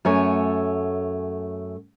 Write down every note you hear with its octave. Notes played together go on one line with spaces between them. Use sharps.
F#2 A3 C#5 G#5